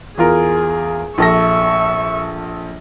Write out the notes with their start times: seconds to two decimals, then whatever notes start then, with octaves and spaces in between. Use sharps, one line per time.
0.18 E2 F4 G#4 A#4
1.18 A#1 A4 E5 C#6 A#6